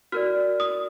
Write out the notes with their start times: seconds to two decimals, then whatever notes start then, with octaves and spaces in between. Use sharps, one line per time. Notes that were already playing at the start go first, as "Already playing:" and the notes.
0.12 F#4 A#4 D5 F6
0.60 D#6